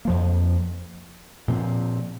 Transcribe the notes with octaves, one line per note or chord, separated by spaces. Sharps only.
F2 F3 A#3
A#2 F3 C4